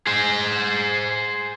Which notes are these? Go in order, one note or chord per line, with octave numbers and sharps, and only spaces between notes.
G#4 C5